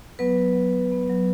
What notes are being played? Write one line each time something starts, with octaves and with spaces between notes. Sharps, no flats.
F#3 B3 B4
F#3
F#3
F#3
B3
F#3